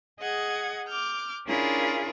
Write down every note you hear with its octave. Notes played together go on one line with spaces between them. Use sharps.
G#4 D#5 F#5 G#6
D6 F6 G6
C#4 D4 E4 F4 G#4 A#4